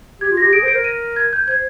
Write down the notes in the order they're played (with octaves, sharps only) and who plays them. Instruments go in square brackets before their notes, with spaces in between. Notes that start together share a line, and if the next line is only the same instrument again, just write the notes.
[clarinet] G4 [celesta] G#6
[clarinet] F4
[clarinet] G4 [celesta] A#6
[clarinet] G#4 [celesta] D7
[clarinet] C5
[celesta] D7
[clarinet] A#4
[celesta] D#7
G#6
G6
[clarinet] C5 [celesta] G#6